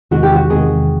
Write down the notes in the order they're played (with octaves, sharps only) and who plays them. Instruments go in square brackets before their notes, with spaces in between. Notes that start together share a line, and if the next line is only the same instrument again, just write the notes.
[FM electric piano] E2 C3 D#3 G#3 [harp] F#4
[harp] G4
F#4
[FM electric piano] E2 C3 D#3 G#3 [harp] G#4